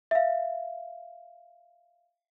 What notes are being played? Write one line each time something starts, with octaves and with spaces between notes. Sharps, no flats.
E5 F5